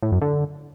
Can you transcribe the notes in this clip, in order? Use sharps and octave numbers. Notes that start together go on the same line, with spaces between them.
A2
F#2
D3